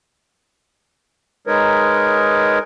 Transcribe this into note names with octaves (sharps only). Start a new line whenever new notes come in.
G#3 D#4 A#4 B4 C#5